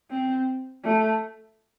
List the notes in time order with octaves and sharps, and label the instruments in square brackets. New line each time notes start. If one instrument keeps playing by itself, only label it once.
[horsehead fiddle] C4
A3